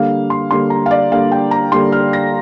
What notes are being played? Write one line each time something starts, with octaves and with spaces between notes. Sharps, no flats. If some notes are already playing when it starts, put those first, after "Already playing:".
Already playing: D3 G3 A#3 F5
C6
D3 G3 A#3 C6
A#5
F5
D5
D3 G3 A#3 F5
G5
A#5
D3 G3 A#3 C6
F6
A#6